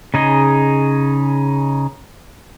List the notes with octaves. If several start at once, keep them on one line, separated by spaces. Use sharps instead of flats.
C#3 D#4 G#4 D#5